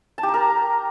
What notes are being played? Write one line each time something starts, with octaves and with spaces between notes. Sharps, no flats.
A5
G4
A#5
A#4